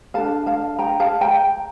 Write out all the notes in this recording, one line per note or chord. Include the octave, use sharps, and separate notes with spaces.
D4 A4 F5 A5
F5 A5
G5 A#5
F5 A5
G5 A#5